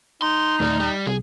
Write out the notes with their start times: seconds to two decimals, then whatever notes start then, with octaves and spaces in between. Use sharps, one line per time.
0.22 D#4 C6
0.60 D#1 A3 D5
0.80 G3
1.07 C2 G#4